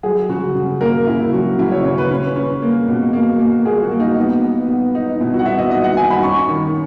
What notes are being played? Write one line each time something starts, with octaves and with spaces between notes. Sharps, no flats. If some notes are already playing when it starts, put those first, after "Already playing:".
F#3 G#4
C#3 F#4
C#3
A#3 A#4
C#3 E4
F#3 F#4
C#3 E4
C#5
C#3 C#5
B4
C#4 B4
C#4
A#3
B2
A#3
A#3
A#3 G#4
F#4
A#3
D#4
B3
B3
B3
D#4
B2 E4
F#4
F#5
B3 E5
D#5
D#4 D#5
F#5
D#4 G#5
B5
C#4 C#6
D#3